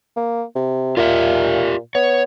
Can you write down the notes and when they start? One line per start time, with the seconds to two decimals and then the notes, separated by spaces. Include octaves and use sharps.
0.17 A#3
0.55 C3
0.97 A#2 F4 G4 E5
1.95 B3 C#5